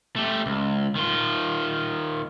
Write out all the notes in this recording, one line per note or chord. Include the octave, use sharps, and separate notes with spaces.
A3 G4
C#2
D#3 F4